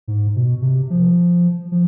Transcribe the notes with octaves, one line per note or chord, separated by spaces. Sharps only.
G#2
B2
C3
F3
F3